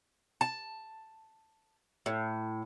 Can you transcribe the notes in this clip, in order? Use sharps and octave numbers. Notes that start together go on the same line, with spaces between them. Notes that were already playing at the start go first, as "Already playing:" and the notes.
A5
A2